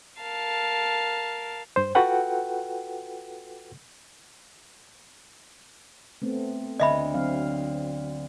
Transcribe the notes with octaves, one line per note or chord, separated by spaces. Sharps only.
A#4 F5 A5
G2 C5
F4 F#4 A4 B4 F#5 G5
A3 B3 C4
D2 D#5 E5 B5
F#3 C4 F5